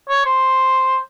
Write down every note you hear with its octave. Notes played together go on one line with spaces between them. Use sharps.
C#5
C5